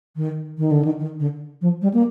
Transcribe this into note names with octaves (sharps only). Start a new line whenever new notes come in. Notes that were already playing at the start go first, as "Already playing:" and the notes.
D#3
D#3
D3
D#3
D#3
D3
F3
G3
A#3